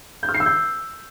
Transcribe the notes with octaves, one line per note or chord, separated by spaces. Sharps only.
G6
F6
C7
E6
G6